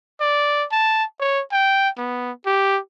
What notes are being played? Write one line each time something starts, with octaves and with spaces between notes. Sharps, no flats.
D5
A5
C#5
G5
B3
G4